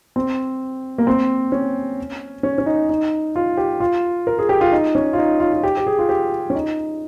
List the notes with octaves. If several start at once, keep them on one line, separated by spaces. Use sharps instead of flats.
C4
A#3
C4
C#4
C#4
C#4
D#4
D#4
F4
G4
F4
A#4
G#4
G4
F4
D#4
C#4
F4
D#4
F4
F4
G4
G4
G#4
F4
G4
C#4
D#4